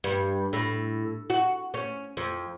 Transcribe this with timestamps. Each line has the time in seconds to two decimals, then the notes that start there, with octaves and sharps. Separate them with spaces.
0.04 G2
0.53 A2
1.30 F#4
1.74 C#4
2.17 F2